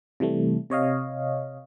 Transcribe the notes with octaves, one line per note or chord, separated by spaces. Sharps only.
C3 E3 G3 A3
C3 C#5 D#5 F5